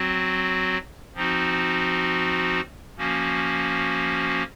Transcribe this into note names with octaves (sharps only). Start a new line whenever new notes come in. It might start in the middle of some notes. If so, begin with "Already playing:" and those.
Already playing: F#3 C4 F#4
F3 C4 D#4 F#4
F3 A#3 C#4 F#4